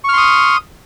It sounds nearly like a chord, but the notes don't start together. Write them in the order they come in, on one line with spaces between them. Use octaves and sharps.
C#6 F6 C6 D#6